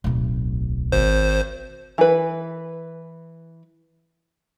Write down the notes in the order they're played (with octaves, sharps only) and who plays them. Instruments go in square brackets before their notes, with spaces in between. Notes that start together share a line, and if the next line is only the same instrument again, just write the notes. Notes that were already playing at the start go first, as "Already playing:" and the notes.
[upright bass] D1 B1
[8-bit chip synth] G#1 C5
[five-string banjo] E3 B4